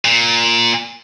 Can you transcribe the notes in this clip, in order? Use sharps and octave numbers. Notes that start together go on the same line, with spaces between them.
A#2